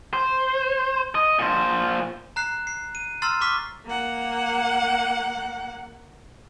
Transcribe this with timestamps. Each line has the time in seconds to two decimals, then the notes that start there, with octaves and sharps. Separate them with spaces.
0.13 C5
1.15 D#5
1.39 A#2 C5
2.36 A#5 F#6 C7
2.67 C7
2.95 D#7
3.22 A#5 C6 E6 F6 A6 C7
3.41 C#6 D6 F6 B6
3.86 A#3 F#5